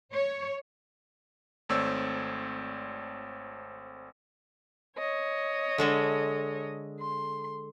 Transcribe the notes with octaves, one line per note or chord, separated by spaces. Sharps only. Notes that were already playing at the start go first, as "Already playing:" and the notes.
C#5
G#1 A3 C4 C#5 D5 E6
C#5 D#5
D3 G#3 A4
C6